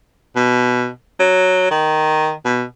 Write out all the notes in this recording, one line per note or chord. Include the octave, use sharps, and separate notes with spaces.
B2
F#3
D#3
B2